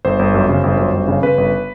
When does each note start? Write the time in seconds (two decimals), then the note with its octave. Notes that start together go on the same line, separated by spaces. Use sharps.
0.05 G1 C5
0.19 G1
0.34 F#2
0.49 C#3
0.64 G1
0.78 F#2
0.93 G1
1.08 C#3
1.23 C#3 B4
1.38 G1